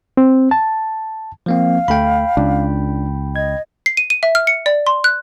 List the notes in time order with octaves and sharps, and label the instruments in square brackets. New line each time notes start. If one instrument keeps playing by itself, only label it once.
[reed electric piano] C4
A5
[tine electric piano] F3 A#3 C4 [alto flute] F5
[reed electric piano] D2 A3 [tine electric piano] G5 B5
[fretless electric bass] C#2 [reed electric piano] D4
[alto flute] D#5 [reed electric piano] G#6
[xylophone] C7
D#7
D#7
E5
F6
C#7
D5
C6
F#6